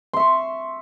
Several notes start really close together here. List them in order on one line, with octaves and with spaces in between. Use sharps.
C6 E5 C#6